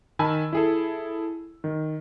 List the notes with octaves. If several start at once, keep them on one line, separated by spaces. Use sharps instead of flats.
D#3 G#5 A5 B5 E6
E4 G#4 A4
D#3